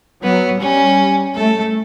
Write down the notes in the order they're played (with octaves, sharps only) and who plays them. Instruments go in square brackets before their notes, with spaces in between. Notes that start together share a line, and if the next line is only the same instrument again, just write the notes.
[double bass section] F#3 [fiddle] B3
[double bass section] G3 [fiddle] C#4
[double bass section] A3 [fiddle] A4